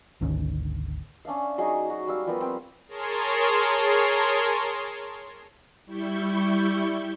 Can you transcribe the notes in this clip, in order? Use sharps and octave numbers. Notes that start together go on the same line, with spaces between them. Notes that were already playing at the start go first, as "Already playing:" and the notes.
G#1 D2 D#3 C#4
C#4 D4 E5 F5
F#3 D#4 G#4 C#6
F#4
G3 F5 E6
F3 G3 B3 A#4
C4 G5
G#4 A#4 C#5 A5 C6
G3 E4 C#6 G6